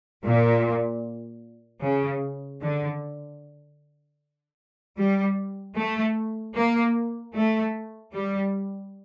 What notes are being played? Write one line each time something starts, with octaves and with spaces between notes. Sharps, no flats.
A#2
C#3
D3
G3
A3
A#3
A3
G3